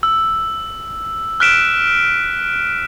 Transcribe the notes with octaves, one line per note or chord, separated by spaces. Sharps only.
E6
F6 F#6 B6 D7 E7